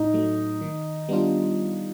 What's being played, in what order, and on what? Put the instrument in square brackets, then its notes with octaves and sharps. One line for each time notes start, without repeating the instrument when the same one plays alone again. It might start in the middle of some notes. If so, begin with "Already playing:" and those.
Already playing: [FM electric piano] A2 [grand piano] D#4
[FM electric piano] F#3 A3
D#3
G3 B3 D4 F4